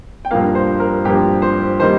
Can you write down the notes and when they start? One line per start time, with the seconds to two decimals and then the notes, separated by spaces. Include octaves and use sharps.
0.25 G5
0.31 G2 F3 A#3 F5
0.55 C5
0.80 A#4
1.05 G2 F3 A#3 G4
1.42 C5
1.80 D#3 G3 A#3 C5